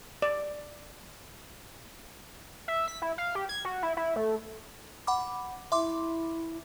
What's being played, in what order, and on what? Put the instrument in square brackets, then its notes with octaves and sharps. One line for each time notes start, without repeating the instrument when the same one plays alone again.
[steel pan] D5
[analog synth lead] E5
B6
E4
F5
G4
G#6
F#4
E4
E4
A3
[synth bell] F#5 B5 D6
[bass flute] E4 [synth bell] E5 C6 D6